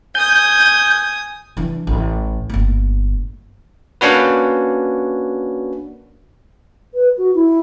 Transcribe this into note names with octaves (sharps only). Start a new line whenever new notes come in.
G#5 D#6 G6
E3 D4
A1
G1 A#3
A#3 C#4 D4 F#4 B4
B4
F#4
E4